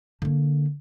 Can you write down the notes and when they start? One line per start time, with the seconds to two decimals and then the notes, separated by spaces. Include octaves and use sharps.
0.22 D3 A#3